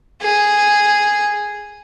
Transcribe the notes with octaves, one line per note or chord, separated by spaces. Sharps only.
G#4